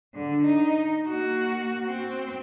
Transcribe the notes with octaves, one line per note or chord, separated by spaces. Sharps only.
D3
D#4
A#3 F#4
C4